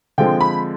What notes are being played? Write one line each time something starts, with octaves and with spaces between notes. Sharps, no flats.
D3 F3 G#3 C4 G5
B5